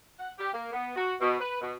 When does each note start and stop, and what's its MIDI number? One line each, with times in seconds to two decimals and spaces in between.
0.19 0.31 78
0.38 0.51 67
0.54 0.71 58
0.73 0.92 59
0.96 1.14 66
1.20 1.40 47
1.40 1.59 71
1.61 1.74 47